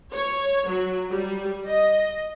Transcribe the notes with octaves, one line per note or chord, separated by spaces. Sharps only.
C#5
F#3
G3
D#5